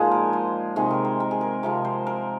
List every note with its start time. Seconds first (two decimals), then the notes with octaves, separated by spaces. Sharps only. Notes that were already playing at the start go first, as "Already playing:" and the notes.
Already playing: A#2 F3 G#3 D#4 F4 G#4
0.11 A#4
0.33 C5
0.76 C3 D#3 G#3 G#4
0.91 A#4
1.05 C5
1.20 A#4
1.31 G#4
1.41 A#4
1.63 C3 F3 G#3 A#4
1.85 C5
2.07 A#4